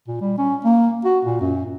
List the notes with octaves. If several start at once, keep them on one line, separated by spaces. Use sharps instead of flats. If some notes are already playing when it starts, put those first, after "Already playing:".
A#2
G3
C#4
A#3
F#4
A#2
F#2